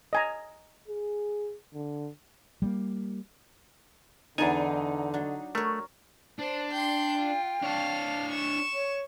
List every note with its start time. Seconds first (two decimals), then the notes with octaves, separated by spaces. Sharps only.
0.13 D#5 G#5 A#5
0.88 G#4
1.74 D3
2.62 G3 G#3 A#3
4.38 E2 D3 B3 D4 D#4 G#5 A5
5.14 F#3 D4
5.55 A3 A#4 C#5
6.39 D4 C5
6.72 G5 C6 G6
7.18 F4
7.62 D4 C#5 F5 A5
8.30 C#6 E7
8.73 C#5